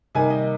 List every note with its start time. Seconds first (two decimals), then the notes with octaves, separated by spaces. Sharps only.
0.15 C3 D#3 G3 A#3 D#4 G#5
0.30 D#5